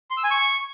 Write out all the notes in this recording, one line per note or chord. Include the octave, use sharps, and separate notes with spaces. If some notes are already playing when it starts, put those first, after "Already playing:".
C6
E6
G#5
C#6